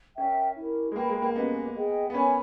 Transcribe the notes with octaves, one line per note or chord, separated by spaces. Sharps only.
C#4 A#4 E5 G5
E4 G4 A#4
G#3
A#3 B4 G5 B5
G#3
A#3
B3 C#4 G4 B4 D#5
G#4 D#5 G5
B3
C#4 A#4 C#5 G#5 B5